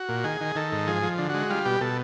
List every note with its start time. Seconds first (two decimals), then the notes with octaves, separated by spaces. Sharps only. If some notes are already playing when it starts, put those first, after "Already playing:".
Already playing: F#4
0.09 A#2
0.24 D#3 G#4
0.41 D#3
0.56 D#3 A4
0.72 G#2
0.87 F3 G#4
1.03 F3
1.18 D3
1.29 G#3 F#4
1.50 G3 F4
1.65 B2 G4
1.81 B2 A4